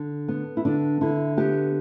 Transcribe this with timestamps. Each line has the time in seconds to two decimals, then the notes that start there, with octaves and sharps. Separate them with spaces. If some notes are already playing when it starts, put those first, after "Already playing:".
Already playing: D3
0.28 B3
0.57 E4
0.65 D3 D4
1.01 D3 E4
1.37 B3 G4